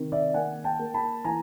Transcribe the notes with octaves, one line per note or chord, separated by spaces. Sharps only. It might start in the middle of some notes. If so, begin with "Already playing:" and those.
Already playing: C3 D#3
D5 E5
A#3 F#5 G#5
G5 A5
A#3
A5 B5
E3 G#5 A#5